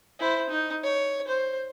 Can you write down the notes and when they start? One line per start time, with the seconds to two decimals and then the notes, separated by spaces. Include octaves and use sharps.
0.19 E4 C5
0.49 D#4
0.83 C#5
1.27 C5